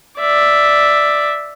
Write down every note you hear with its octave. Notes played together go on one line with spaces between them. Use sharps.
D5 E5